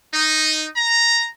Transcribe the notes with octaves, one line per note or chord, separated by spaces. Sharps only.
D#4
A#5